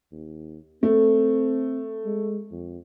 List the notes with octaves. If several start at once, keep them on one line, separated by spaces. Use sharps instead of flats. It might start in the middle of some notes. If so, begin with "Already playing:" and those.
D#2
A3 C4
G#3
F2